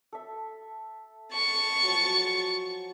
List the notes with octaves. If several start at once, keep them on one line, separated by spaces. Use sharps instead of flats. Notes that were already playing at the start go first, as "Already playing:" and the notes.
A4 E5
A5 C#6 A6
F3 F#3
G#5 C6